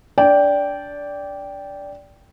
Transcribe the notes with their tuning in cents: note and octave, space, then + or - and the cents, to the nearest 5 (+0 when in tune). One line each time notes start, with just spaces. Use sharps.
D4 -15 D5 -15 G5 +0